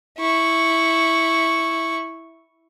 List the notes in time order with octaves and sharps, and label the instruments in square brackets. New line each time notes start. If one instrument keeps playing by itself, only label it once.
[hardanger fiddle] E4 C#6